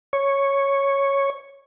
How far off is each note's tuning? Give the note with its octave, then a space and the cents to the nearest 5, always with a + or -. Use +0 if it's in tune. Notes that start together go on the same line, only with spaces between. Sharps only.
C#5 -5